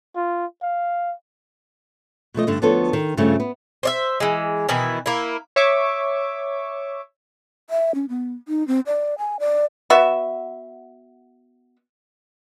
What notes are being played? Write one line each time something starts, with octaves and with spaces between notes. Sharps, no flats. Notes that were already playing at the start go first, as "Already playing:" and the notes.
F4
F5
B2 F3 A3 D#5
G2 D3 A3
D2 F3 B3 D4 A4 C#5
D#3
G2 C#3 F3 G3 A3
B3
C5 D5 E5
E3 G#3
B2 D#3 E3 E4
A#3 E4
C#5 E5 C#6 D6
E5
C#4
B3
D#4
C4
D5
G#5
D5
B3 F#4 E5